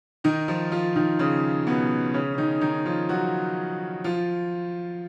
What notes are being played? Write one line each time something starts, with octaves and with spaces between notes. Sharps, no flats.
D#3 D#4
F3 F4
F3 F4
D#3 D#4
C#3 C#4
B2 B3
C#3 C#4
C#4
D#3 D#4
D#3 D#4
F3 F4
F#3 F#4
F3 F4